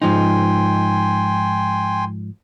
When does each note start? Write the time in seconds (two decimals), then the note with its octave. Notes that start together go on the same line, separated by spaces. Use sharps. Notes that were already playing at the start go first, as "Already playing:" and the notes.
0.02 G#2 F3 D#4 G5 G#5 C6